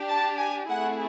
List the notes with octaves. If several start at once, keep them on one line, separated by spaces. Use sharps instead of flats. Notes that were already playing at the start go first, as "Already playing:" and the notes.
Already playing: D4 G4
A5
G#5
A3 C4 E4 G#4 F#5